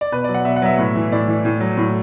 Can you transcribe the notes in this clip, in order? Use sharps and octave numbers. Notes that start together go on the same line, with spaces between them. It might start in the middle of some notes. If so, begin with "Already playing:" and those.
D5
B2 B4
F#3 D5
F#5
B2 E5
F#5
F#3 E5
A2
E3
A2 D5
E3
A2
F#3
A2